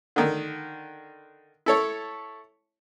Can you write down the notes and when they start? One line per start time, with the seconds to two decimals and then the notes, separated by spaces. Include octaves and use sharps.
0.16 D3 D#3
1.66 E4 A4 C#5